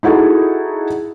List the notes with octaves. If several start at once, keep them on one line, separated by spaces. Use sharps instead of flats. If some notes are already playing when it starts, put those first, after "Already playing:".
D#4 E4 F#4 G#4 A4